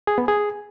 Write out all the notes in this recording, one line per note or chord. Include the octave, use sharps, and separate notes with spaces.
G#4
B3
G#4